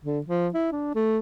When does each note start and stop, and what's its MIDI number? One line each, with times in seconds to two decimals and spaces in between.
0.04 0.20 50
0.26 0.48 53
0.54 0.69 64
0.72 0.93 62
0.95 1.19 57